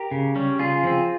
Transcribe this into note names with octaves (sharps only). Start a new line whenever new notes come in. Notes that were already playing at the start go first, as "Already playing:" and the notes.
Already playing: G4 A#4
C#3
G3 C#4
C#3 F4 G#4
F3 C4